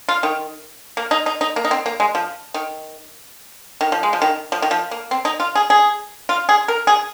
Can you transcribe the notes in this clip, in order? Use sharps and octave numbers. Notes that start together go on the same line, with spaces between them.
F4
D#3
A#3
D#4
D#4
D#4
A#3
D#4
C4
A#3
G#3
F3
D#3
D#3
F3
G#3
F3
D#3
F3
D#3
F3
A#3
C4
D#4
F4
G#4
G#4
F4
G#4
A#4
G#4